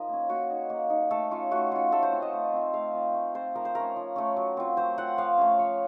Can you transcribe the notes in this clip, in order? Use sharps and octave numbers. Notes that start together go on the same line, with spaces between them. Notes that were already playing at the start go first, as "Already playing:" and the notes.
Already playing: F3 D#4 A#4 D#5
A#3 C#4
A#3 F#4
D#4
A#3
D#4
A3 A4
C#4 F4
A3 F#4
C#4 F4
A3 A4
C5
C4 F4
D#5
A3
C4 F4
A3 F5
C4 F4
A3
C4 F4 C5
F3 A#4
C5
A3 C#4 A#4
F3
A3 C#4
F#3
C4 F4
F#3 C5
C4 F4 F#5
F3 F5
A3 C#4
F3 C#5